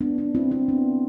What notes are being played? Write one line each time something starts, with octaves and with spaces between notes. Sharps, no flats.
B3 D4
B3 D4
C4 E4
C4 E4
B3 D4